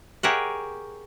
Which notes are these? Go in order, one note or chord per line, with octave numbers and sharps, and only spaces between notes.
G4 G#4 A#4 C#5 E5 F#5